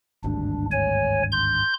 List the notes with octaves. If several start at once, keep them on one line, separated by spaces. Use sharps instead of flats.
G#1 D2 G2 D4
C#5 G#5
C6 G6